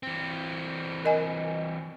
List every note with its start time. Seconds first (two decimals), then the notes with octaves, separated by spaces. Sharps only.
0.03 E3 C4
1.05 A#4 D#5 G#5